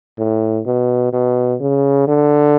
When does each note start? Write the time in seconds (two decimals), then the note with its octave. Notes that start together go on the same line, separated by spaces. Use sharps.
0.18 A2
0.66 B2
1.13 B2
1.60 C#3
2.08 D3